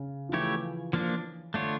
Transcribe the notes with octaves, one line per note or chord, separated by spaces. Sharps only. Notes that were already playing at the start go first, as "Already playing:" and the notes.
Already playing: C#3
F3
E3 A3 E4 G4 C#5
F3 A#3 D4
D3 A3 D4 F4 C#5